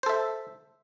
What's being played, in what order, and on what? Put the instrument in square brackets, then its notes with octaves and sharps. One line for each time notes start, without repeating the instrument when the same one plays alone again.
[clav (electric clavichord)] C5
A4
E5